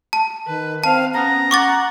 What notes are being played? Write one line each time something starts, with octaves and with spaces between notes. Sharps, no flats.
A5
D#3 B4
C4 F5 A5
B3 C#4 A#5
F#5 C#6 D6 A6